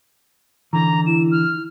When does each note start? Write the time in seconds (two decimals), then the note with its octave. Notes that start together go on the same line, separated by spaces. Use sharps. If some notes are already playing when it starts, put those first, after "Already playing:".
0.73 D3 E3 A#5
1.06 E4 E7
1.31 F6